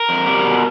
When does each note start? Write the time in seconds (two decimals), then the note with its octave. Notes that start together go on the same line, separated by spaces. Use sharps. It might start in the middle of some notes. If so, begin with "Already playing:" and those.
Already playing: A#4
0.09 F2
0.26 G3
0.45 B2